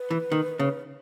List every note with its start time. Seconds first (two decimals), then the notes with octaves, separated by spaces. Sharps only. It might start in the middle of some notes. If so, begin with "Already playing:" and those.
Already playing: B4
0.11 E3
0.32 D#3
0.59 C#3